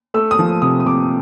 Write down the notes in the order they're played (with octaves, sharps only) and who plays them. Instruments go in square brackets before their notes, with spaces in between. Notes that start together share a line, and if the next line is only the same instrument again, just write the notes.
[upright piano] A3 E6
D#6
F3
C3 D#6
D#6
C3 D6